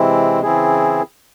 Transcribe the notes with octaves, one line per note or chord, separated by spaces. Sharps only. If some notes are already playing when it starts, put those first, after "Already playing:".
Already playing: C3 E3 G#3 C4 E4
C#3 E3 C4 E4 G#4